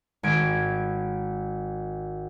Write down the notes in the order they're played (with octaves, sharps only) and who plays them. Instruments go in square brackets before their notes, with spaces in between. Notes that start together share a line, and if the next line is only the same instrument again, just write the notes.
[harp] G#1 G#6 D7